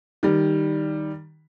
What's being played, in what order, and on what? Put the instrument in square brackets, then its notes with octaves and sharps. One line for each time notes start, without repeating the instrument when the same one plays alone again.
[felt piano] D#3 G3